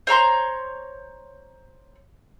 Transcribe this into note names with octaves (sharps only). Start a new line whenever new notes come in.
C5 C#5 A#5 C6